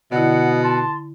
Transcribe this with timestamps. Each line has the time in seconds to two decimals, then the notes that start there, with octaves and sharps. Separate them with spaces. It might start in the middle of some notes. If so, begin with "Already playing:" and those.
0.12 B2 D3 E4 D#5 F#5
0.63 A5 C6